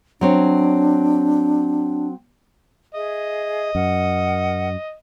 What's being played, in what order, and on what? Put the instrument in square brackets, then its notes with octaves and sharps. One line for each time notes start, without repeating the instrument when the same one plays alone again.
[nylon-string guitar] F#3 C4 C#5 [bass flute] D4
[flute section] G#4 E5 [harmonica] D#5
[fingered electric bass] F#2 [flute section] A#4 F#5